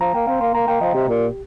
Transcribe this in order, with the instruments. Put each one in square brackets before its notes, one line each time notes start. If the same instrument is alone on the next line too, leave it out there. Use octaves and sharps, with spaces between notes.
[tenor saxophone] F3 [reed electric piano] A#5
[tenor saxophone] A#3 [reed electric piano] G5
[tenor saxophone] C4 [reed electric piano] F5
[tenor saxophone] A#3 [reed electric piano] C6
[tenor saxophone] A#3 [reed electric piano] A#5
[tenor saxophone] A#3 [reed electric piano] G5
[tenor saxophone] F3 [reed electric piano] D#5
[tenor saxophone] C3 [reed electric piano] G4
[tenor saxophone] A#2